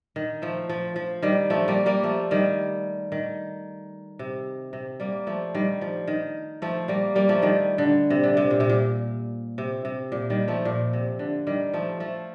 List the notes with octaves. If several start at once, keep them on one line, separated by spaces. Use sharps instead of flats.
D#3
F3 A3
F3
F3
D#3 G3
F3 A3
G3 A#3
G3 A#3
F3 A3
D#3 G3
D#3
C3
C3
G3 A#3
F3 A3
D#3 G3
F3
D#3
F3 A3
G3 A#3
G3 A#3
F3 A3
D#3 G3
D3
C3
D3
C3
A#2
C3
A#2
C3
C3
A#2
D#3 G3
F3 A3
A#2
C3
D3
D#3 G3
F3 A3
F3 A3